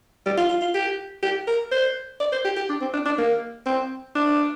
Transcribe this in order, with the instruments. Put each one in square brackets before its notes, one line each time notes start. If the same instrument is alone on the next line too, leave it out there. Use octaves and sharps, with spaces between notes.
[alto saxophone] G3
F4
F4
F4
G4
G4
A#4
C5
D5
C5
G4
G4
D4
C4
D4
D4
A#3
C4
D4